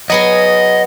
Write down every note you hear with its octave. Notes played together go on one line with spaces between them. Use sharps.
F#3 B3 G#4 D#5